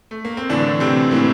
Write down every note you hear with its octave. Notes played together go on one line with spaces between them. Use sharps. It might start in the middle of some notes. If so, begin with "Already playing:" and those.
A3
A#3
C4
A2 D3 E3 D4
A2 C3 E3 C4
A2 E3 A#3